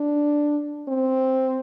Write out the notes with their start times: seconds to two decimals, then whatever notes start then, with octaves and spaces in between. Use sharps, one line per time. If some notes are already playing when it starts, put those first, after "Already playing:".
Already playing: D4
0.88 C4